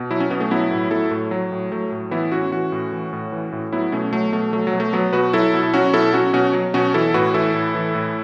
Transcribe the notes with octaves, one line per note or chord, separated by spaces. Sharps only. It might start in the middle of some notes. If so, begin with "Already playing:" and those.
Already playing: B2
F#3 E4
C#4
B2 B3
A3 C#4
F#3 B3 E4
A2
F#3 E4 A4
A2 A3
F#3
A2
F#3 A3
A2
E3 B3 E4
A2 C#4 F#4
E3 C#4 F#4
A2
E3
A2
E3
A2
F#3 B3 E4
B2 A3 C#4
F#3 A3
B2 A3
F#3 A3
F#3
B2
A3
F#3 B3
B2 F#4 B4
F#3 E4 A4
B2
E4
F#3 C#4 F#4
B2 E4 A4
F#3 C#4 F#4
B2 C#4 F#4
F#3
B2 C#4 F#4
E3 E4 A4
A2 F#4 B4
E3 E4 A4
A2
E3
A2